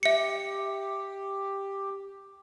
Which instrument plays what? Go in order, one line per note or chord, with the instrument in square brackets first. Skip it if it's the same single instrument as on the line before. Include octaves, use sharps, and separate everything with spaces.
[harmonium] G4 [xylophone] E5 C#7